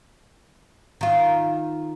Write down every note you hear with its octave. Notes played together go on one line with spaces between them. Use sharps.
D#3 F4